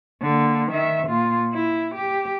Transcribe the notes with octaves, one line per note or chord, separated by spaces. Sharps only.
D3 A#3
D#3 E5
A#2 F4
E4
G4